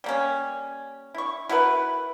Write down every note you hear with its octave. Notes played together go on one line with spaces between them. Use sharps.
G3 A#3 C#4
E4 C#6
E4 F#4 A#4 B4